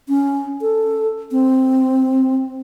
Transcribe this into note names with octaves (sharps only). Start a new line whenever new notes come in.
C#4
A4
C4